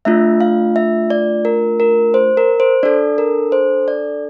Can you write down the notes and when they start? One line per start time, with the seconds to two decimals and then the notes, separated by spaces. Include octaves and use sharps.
0.05 A3 D4 F4 E5
0.40 F5
0.76 E5
1.10 D5
1.45 A#4
1.80 A#4
2.14 C5
2.37 A#4
2.60 C5
2.83 D4 A4 D5
3.18 A#4
3.52 C5
3.88 D5